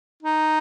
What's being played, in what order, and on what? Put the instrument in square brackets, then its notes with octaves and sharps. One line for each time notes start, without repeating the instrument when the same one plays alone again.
[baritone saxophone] D#4